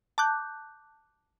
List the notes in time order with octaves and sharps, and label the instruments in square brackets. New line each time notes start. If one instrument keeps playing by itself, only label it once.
[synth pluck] A5 D6 F#6 G6